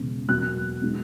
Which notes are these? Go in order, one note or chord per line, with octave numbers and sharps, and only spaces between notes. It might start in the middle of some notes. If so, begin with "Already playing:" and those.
Already playing: E1 E2 C#3
E2 B2 F#3 A#3 F#6
B2 G#3 B3 D#4